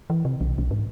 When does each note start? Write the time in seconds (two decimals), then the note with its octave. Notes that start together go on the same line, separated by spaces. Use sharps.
0.10 E3
0.25 C3
0.41 B1
0.58 B1
0.71 G#2